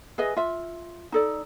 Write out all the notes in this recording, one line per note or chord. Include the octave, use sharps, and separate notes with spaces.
G#4 B4 D#5 E5
F4 E5
D#4 A4 D5